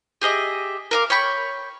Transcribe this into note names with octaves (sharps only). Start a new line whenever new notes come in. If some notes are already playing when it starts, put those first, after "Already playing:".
G4 G#4 D#5 E5
A#4 F5 D6
C#5 G5 B5 C#6